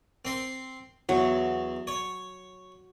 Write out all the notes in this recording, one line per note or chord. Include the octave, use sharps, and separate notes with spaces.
C4 C6
E2 F#3
C#5